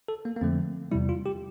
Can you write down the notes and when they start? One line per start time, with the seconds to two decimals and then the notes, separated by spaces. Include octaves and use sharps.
0.08 A4
0.25 A#3
0.36 A#3
0.41 F2 D3 F3 A3 C4
0.91 E2 C3 G3 E4
1.09 F4
1.26 G4